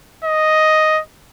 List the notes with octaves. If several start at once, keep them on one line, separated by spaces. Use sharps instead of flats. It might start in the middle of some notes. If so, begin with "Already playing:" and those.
D#5